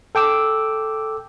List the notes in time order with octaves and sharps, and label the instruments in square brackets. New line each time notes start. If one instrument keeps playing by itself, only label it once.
[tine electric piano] A4 G5 D6 E6